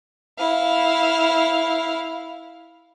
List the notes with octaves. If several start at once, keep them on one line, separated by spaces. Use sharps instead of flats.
E4 F5